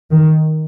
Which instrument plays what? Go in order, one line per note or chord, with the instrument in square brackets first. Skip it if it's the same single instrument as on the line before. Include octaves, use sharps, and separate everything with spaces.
[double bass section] D#3